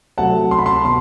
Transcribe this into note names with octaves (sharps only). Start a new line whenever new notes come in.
C3 F#3 A3 F#5 A5
C6
B5
A5 C6
B2 C6